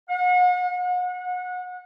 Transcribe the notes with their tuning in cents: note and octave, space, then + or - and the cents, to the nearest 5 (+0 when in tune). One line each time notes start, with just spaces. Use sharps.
F#5 -40
F#5 -30